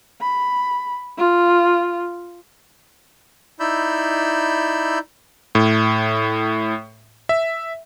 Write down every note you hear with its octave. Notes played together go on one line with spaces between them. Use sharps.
B5
F4
D#4 E4 D5 B5 E6 G6
A2
E5